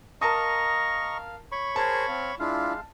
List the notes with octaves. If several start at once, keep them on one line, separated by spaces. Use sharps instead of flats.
A#4 D#5 F5 A5 A#5 C#6 D#6
C#5 B5 C#6
G#4 A#4 C5 A5
C4 F5
G#3 D4 E4 F4 F5